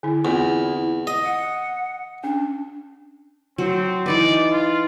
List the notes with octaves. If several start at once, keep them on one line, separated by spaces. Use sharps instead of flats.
D3 E4
E2 C4 E4 F4
D#5
F#5
C#4 D4
F#3 C4
E3 D#4 B4 D5
F4